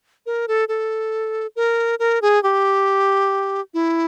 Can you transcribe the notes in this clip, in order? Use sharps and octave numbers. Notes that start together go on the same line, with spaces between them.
A#4
A4
A4
A#4
A#4
G#4
G4
E4